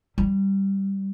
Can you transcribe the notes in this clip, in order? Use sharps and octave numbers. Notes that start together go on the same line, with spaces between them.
G3